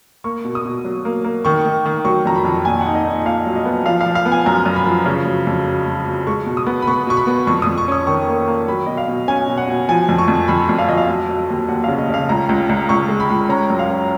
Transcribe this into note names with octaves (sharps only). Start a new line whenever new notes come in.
A#3 C#6
B2
D#6
B2
F#3
A#3
A#3
D#3 C#6
D#3
D#3
F#3 C#6
F2 A#5
B5
F2
A#2 G#5
D#4 F#5
D#5
D#4
D#5
A#2 F5
F#3
D#5
B3
F3 F5
F5
F3
F5
B3
G#5
F#2 A#5
F#2
B5
F3
C#3
F#3
F2
F#3
F#3
F#3
G#3 C#6
B2
D#6
B3
B5
B3 C#6
B2 C#6
B5
B3
F2 C#6
F2 D#6
C#6
C#4 D#6
D#3 C#6
A#3
A#3
F#3 B5
B2 D#5
F5
B2
C#4 G#5
B2
F#5
B2
F3 G#5
F2
C#6
F2
F2 B5
F2
F5
F2 D#5
F5
F#3 D#5
F#3
D#2
D#2 F#5
C#3 F5
D#5
C#3 F5
C#2 A#5
C#2
C#2
C#2 C#6
G#3
B5
C#2
C#4 A#5
F#2
F5
C#4